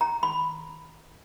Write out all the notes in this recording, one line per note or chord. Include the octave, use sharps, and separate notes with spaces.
A#5
B5